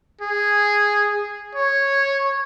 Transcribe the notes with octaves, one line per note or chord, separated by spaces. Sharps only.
G#4
C#5